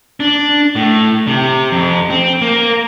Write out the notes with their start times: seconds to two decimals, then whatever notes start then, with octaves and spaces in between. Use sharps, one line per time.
0.20 D4
0.76 A2
1.27 C3
1.72 F2
2.10 C4
2.41 A#3